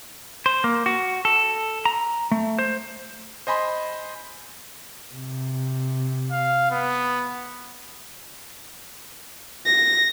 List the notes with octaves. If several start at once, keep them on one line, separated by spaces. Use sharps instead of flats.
C5
A#3
F#4
A4
A#5
A3
C5
C5 D#5 G#5 B5 C6
C3
F5
B3
A#6